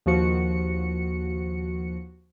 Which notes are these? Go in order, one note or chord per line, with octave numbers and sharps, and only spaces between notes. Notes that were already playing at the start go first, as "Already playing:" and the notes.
D#2 F3 F#4 C#7